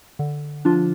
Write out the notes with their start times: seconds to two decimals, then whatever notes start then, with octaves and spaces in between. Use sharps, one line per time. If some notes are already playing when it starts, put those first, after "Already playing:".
0.19 D3
0.65 F3 D4 F4